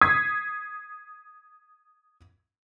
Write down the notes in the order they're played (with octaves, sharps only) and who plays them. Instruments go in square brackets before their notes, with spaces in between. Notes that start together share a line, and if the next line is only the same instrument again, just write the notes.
[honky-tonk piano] D#6 G#6 B6 C7